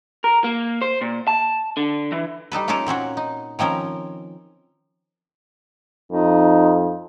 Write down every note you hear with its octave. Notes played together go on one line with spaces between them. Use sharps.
A#4
A#3
C5
A#2
A5
D3
E3
G3 D#4 A4 B4
A#3 C#4 D#4 F4 A4 A#4
A#2 C4 C#4 F#4
D#4
D#3 F3 C4 C#4 A#4
F2 D#4